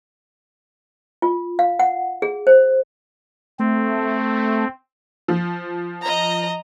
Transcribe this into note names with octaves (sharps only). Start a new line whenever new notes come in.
F4
F5
F#5
G#4
C5
A3 C4
F3
D#5 A#5